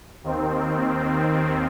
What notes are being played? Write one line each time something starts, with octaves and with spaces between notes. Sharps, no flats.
D#2 D#3 C4